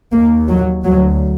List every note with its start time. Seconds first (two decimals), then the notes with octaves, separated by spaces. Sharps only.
0.12 D#2 A#3
0.49 F#3
0.85 D2 F#3